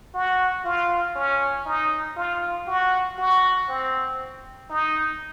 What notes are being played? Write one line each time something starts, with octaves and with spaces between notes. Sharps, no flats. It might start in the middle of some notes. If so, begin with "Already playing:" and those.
F#4
F4
C#4
D#4
F4
F#4
F#4
C4
D#4